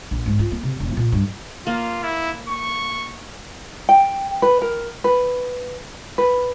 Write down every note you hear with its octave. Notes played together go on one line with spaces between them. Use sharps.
A#1
G#2
F4
A#3
C3
E1
A#2
G2
A#3 F4
E4
C#6
G5
B4
A#4
B4
B4